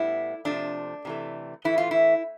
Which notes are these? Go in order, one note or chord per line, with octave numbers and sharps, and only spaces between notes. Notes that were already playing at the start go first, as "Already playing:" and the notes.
Already playing: A2 G3 B3 E4
C3 F3 A3 D4
C3 E3 A3
A2 E3 A3 E4
F4
E4